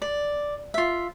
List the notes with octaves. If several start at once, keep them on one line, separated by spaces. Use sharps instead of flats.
D5
F4 E5